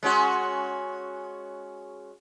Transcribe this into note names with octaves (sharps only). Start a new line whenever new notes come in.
G#3 C#4 F#4